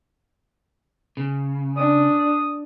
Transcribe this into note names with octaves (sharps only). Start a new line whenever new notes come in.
C#3
D4 D#6